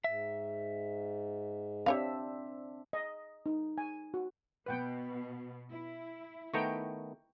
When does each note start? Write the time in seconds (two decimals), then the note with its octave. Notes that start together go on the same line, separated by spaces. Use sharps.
0.04 G#2 E5
1.86 C4 D4 G4 C#5 E5 F5
2.93 D#5
3.46 D#4
3.78 G#5
4.14 F#4
4.66 B2 B3 B4 F#5 G5
5.70 E4
6.54 D#3 A3 B3 G5 A#5 C#6